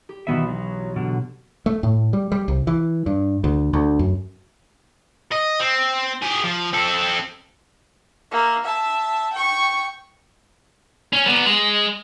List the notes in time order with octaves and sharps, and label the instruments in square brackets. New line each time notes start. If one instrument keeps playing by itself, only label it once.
[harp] G4
[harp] B1 B2 E3 [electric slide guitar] D#3 B3 E5
[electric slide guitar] F#3
B2 D3
[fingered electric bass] A3
A2
G3
G3
C2
E3
G2
D2
D2
F#2
[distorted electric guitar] D#5
C4
G4 G#4
F3
C4 A4
[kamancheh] A#3 E5
E5 A5
G5 C#6
[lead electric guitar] C#4
G3 B3
G#3